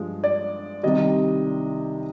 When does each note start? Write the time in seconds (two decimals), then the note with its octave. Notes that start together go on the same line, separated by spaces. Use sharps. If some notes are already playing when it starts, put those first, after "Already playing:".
Already playing: G2 F3 G#3
0.24 D5
0.83 C2 C3 D#3 G3 D#5